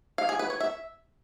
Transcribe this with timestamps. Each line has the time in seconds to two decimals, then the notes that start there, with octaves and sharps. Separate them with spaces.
0.18 F5
0.29 G#4
0.39 B4
0.50 C#5
0.60 E5